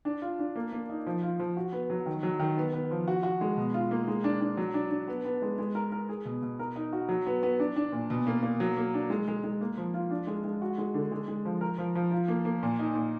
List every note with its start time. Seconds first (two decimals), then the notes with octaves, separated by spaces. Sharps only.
0.05 D4
0.22 F4
0.39 D4
0.56 A#3
0.72 A#3
0.89 D#4
1.07 F3
1.22 F4
1.40 F3
1.57 F#4
1.72 B3
1.90 F#3
2.06 D#3
2.23 F#3
2.40 D#3
2.57 B3
2.73 B3
2.91 F3
3.08 F#4
3.23 F#4
3.41 G#3
3.57 B2
3.74 F4
3.91 A#3
4.08 G#3
4.24 D4
4.41 D4
4.57 F#3
4.74 D4
4.91 D4
5.08 B3
5.25 B3
5.42 G#3
5.58 G#3
5.75 A#4
5.92 A#4
6.09 G#4
6.25 B2
6.42 B2
6.59 A#4
6.76 D#4
6.93 F#4
7.09 F#3
7.27 B3
7.43 B3
7.60 D4
7.76 D4
7.92 A#2
8.10 B2
8.27 A#3
8.43 A#3
8.60 F#3
8.77 A#3
8.94 D4
9.10 G#3
9.28 G#3
9.44 G#3
9.61 A#3
9.78 F3
9.94 F4
10.11 D4
10.27 G#3
10.44 G#3
10.62 F#4
10.78 G#3
10.94 D3
11.11 G#3
11.28 G#3
11.45 F3
11.61 A#4
11.78 F3
11.95 F3
12.11 F4
12.28 A#3
12.45 A#3
12.63 A#2
12.79 D#4
12.95 A#2